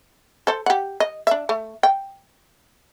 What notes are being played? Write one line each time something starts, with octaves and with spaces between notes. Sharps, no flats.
A4 C5
G4 F#5
D#5
D4 E5
A3
G5